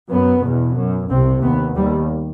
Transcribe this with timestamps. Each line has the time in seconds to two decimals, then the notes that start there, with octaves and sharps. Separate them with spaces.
0.10 F#2 B3
0.44 E2 B2
0.76 F#2
1.10 C2 C3 C4
1.43 D#2 B3
1.76 D#2 G3